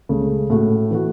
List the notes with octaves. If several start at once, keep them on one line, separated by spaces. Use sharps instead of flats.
C#2 C#3 A3
A2 A3 F#4 A4
E3 A3 F#4